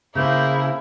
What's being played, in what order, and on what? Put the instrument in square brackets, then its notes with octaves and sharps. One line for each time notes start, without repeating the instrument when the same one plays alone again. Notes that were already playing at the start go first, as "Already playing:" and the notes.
[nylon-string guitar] C#3 C5 [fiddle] A#3 G#4 [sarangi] E4 [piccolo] G6